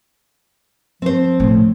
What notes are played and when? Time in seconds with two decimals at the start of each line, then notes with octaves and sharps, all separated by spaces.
1.02 F3 C4 C5
1.40 A2 C#3